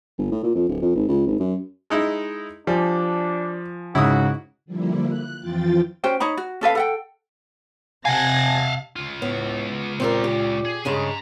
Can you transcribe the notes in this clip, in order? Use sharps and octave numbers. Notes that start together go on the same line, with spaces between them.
G1
A2
A#2
F2
D1
F2
G#1
C#2
G#1
F#2
G#3 D#4 E4
F3 G3 D4 G#5
G#2 C#3 E4 F#4 D#6
D3 F3 G3 A#3 E4
F#6
F2 E3 F3 F4 G5 A6
C#4 F#4 C5 G5
D#4 C#5 A#5 B5
F#4
C#4 A4 B4 F5
A4 F#5 G5
C3 F5 F#5 G#5 A5 G#6 A#6
C#2 F4
A2 B3
A#2 C4 G4 A#4
G4
G#4
G2 C#3 G#3 G#5 A#5